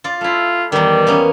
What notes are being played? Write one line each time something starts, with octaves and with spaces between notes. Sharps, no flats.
F4 D5
A3 E4 F4
E2 D#3 G3
A#3 B3 C#4